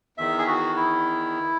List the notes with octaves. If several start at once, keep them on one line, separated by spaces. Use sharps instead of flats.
E2 D#3 E5
G#4
F#4
E4